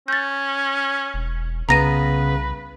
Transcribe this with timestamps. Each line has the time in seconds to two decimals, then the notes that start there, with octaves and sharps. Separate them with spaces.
0.08 C#4 G6 A6
1.14 E1
1.69 C2 C#3 B3 B4 A#5 A#6 D#7